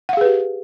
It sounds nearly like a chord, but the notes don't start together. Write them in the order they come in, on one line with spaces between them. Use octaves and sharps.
F#5 F5 G#4 B4 G4